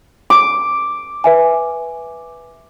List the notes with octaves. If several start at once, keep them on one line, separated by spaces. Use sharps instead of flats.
D6
B4 E5 G#5